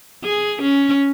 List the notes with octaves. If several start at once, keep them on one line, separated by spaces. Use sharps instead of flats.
G#4
C#4